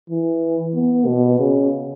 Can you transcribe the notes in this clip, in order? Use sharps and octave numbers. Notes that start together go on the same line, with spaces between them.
E3
B3
B2
C#3